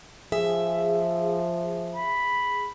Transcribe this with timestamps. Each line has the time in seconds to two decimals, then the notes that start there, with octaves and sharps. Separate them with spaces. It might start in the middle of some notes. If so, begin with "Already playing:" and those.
0.32 F3 G#4 E5
1.95 B5